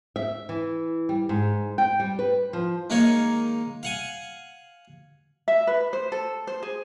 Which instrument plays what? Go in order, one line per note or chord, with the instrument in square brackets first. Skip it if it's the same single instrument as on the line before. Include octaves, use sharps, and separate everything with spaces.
[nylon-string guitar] E5
E3
G3
G#2
G5
G3
B4
F3
[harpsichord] D#3 G#3 A#3 D#4 C#5
F5 F#5 G#5
[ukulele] E5
B4
C5
A4
C5
G#4